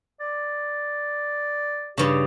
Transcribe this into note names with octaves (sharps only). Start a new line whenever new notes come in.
D5
G2 C#3 G4